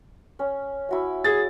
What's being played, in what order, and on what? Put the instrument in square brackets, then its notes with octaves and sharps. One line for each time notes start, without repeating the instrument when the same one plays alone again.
[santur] C#4
E4 F#4 E5
[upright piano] G#4 A6